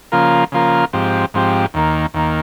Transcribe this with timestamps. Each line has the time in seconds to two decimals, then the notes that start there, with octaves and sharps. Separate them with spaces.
0.12 C#3 F3 A#3 F4 A#4
0.52 C#3 F3 A#3 F4 A#4
0.93 G#2 F3 C4 G4
1.34 G#2 F3 C4 G4
1.74 D#2 D#3 A#3
2.14 D#2 D#3 A#3